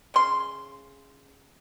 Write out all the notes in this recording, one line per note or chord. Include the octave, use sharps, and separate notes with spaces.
C#3 C6